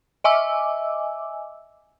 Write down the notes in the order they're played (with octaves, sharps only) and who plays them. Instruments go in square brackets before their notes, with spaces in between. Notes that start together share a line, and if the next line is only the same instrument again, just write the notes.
[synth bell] D#5 E5 G#5 D6 E6